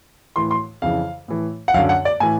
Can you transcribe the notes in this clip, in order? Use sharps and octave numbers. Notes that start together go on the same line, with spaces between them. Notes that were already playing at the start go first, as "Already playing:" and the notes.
A2 E3 C6
C6
F2 C#3 E3 F5
A2 E3
F#5
F#2 D3 F5
F#5
D5
A2 E3 G#5